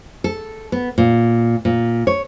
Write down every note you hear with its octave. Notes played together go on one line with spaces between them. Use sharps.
A4
B3
A#2
A#2
C#5